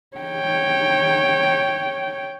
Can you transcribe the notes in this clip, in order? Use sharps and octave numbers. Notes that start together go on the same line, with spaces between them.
C#5 G5